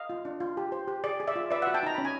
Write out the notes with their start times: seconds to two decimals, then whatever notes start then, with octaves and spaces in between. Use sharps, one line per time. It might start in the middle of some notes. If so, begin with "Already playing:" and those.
Already playing: D#5 F5
0.10 F4
0.25 D4
0.40 F4
0.57 G4
0.72 C5
0.88 G4
1.04 G#4 D5
1.20 G#4
1.27 D5 E5
1.36 F4
1.51 B4 D5 E5
1.62 E5 F#5
1.67 F#4
1.74 G5 A5
1.83 D#4 A#5
1.95 C#4 B5
2.05 G#5